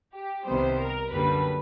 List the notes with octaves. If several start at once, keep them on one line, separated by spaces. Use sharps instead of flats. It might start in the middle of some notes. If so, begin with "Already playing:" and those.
G4
C2 C3 D#3 G3 B3 C5
A#4
F#2 D3 G3 A#3 B4